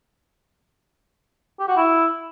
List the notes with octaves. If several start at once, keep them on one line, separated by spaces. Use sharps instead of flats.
G4
F#4
E4